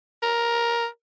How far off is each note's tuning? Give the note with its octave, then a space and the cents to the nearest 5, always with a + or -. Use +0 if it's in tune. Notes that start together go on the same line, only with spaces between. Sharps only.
A#4 +10